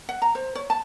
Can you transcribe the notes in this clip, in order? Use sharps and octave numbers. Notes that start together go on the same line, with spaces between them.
F#5
A#5
C5
C#5
A5